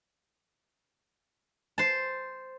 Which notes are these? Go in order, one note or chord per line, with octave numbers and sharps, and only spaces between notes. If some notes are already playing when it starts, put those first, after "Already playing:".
C5 A5